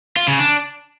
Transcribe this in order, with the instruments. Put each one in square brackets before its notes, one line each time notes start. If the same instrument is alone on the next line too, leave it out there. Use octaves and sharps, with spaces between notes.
[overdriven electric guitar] F4
C#3
D4